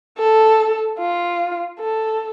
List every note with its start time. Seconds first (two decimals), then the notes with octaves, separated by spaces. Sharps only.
0.18 A4
0.99 F4
1.80 A4